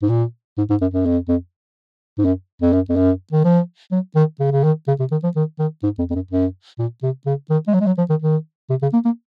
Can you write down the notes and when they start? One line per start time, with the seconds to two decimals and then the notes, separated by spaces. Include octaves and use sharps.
0.02 G#2
0.09 A#2
0.58 G#2
0.70 G#2
0.82 F#2
0.94 F#2
1.06 F2
1.28 F2
2.18 G#2
2.25 F#2
2.62 F2
2.73 F#2
2.90 F2
2.96 F#2
3.32 D#3
3.45 F3
3.92 F#3
4.16 D#3
4.40 C#3
4.52 C#3
4.64 D#3
4.88 C#3
5.00 C3
5.12 D#3
5.24 F3
5.36 D#3
5.59 D#3
5.84 G#2
5.99 F2
6.10 F2
6.15 F#2
6.31 F#2
6.79 A#2
7.03 C3
7.26 C#3
7.50 D#3
7.68 G#3
7.74 F#3
7.81 G#3
7.87 F#3
7.98 F3
8.10 D#3
8.22 D#3
8.70 C3
8.83 C#3
8.93 A#3
9.05 A#3